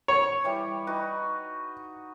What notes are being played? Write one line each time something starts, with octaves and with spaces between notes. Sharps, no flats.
C#5
E3 G3 G4
D#4 F#4 B4